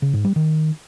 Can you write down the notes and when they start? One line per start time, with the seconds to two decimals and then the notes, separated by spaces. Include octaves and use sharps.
0.02 C#3
0.13 G#2
0.25 G3
0.36 D#3